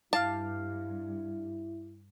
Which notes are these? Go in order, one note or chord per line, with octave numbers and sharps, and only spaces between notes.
G2 E4 G4 F5 A5 F6